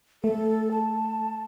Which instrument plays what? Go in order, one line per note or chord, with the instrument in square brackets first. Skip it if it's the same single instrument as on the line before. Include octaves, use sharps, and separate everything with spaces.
[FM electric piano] A3 [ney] A4
[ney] A5